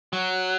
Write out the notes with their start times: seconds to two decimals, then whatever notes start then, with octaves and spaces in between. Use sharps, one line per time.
0.13 F#3